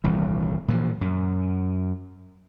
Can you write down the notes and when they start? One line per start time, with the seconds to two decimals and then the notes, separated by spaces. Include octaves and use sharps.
0.04 D#1 C2 E3
0.68 A#2 E3 F3
1.01 F#2